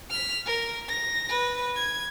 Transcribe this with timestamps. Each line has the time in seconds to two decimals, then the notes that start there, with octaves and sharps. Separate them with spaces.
0.10 F6 B6
0.46 A#4
0.88 A#6
1.29 B4
1.76 G#6